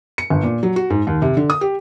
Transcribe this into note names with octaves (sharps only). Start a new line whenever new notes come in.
C#7
G1
A#2
F#3
F#4
G#2
D#2
C3
D3
D#6
G4